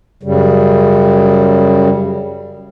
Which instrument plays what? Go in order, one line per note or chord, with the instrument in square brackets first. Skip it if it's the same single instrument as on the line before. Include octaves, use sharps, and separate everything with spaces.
[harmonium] F#2 C#3 G3